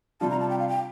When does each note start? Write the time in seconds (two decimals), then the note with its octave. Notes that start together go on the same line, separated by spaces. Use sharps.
0.21 C3 G3 D4 F4 A5
0.30 A#5
0.40 A5
0.50 G5
0.59 F5
0.69 G5